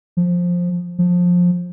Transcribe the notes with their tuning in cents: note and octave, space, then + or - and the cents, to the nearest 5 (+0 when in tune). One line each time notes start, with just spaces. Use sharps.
F3 +10
F3 +20